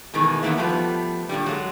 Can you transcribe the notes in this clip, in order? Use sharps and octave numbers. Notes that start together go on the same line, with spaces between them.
B2 D#3 E3 G#3 A3
E2 D#3 F#3 A#3 B3 E5
F3 G3 A3 B3 B4
G2 A#2 D3 G3
F#3 G#3